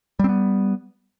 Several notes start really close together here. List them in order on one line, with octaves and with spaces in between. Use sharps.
G3 C4 B3